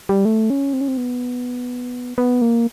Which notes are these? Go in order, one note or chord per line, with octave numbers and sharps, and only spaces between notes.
G3
A3
C#4
C4
C#4
C4
B3
B3
A#3